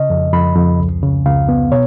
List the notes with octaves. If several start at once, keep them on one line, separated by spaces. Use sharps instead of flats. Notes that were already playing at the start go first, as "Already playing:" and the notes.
Already playing: C#3 D#5
F2
F2 B5
F2
C#2
C#3
C#2 F5
B3
B2 C#5